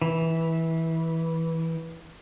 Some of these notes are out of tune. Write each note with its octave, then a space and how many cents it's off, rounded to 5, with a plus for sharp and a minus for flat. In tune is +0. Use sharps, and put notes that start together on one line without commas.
E3 -15